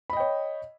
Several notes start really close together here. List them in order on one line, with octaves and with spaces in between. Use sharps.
B5 D#5 G5 C#5